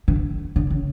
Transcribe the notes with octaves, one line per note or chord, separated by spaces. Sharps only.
D3
D3
C#3